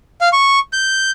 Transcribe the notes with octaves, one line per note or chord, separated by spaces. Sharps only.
F5
C#6
G6